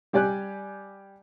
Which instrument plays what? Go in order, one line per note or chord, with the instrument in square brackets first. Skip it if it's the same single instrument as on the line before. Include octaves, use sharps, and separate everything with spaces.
[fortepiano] G3 G4 D5 G#5 F#6